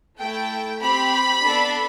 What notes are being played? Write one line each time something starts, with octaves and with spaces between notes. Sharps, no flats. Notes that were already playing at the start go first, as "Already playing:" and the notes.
A3 E4 A4 G5
C4 G4 B5
B3 D4 A4